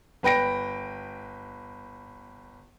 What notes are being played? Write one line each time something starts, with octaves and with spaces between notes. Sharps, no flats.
G1 B4 G5 A#6 D7